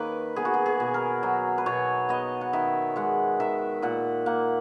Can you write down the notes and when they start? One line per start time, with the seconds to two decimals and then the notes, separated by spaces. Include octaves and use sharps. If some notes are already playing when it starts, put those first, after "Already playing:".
Already playing: D#3 A#3 B4 C#5
0.36 B3 G#4
0.45 F#4
0.54 G#4
0.66 G#4
0.80 B2
0.94 A#4
1.23 F#3
1.58 B4
1.66 B2 C#5
2.09 B3 D#5
2.41 F#5
2.53 D#3 E5
2.96 G#3 F#5
3.40 D#3 E5
3.82 A#2 F#5
4.26 A#3 F#5